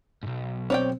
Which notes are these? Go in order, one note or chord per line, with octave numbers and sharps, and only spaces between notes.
B1 G#2
C4 C#5 D5 G5